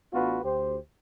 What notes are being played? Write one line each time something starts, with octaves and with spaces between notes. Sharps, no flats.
A1 B3 D4 F4 F#4 B4
D2 G4 C5